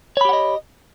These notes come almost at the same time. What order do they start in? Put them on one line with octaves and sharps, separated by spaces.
C#5 B5 G4 F#5 D#5